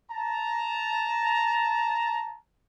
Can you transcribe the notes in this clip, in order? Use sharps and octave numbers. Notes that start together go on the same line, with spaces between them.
A5 A#5